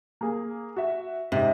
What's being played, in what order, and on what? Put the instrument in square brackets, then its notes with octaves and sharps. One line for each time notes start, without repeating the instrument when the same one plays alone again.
[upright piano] A#3 G#4
F#4 E5
[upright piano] G#2 D#4 [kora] C3